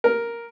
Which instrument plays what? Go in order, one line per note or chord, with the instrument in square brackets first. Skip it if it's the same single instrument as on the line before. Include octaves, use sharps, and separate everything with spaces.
[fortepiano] A#4